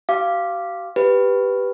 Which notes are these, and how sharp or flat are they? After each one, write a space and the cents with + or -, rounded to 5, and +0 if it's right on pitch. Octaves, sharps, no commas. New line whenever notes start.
G4 -45 F5 -15 D6 +0
G4 +0 B4 +0